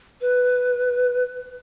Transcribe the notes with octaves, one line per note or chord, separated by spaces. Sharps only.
B4